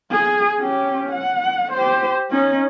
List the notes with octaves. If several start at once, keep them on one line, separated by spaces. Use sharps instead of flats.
G#4
C#4 G4
F#5
G4 C5
C#4 D#4